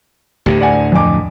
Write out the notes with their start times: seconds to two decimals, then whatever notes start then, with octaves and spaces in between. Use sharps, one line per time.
0.46 D2 A2 D3 G4
0.60 D5 F#5 G#5
0.92 F2 G#5 D6